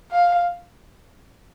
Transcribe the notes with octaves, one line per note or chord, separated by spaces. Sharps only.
F5